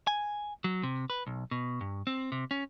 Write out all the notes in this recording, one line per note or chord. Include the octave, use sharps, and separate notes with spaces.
G#5
F#3
C3
B4
B1
B2
G2
C4
C3
C#4